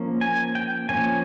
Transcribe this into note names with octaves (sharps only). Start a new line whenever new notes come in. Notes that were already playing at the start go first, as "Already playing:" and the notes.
Already playing: F3 A#3 C#4
G#5
G5
F3 A#3 C#4 G#5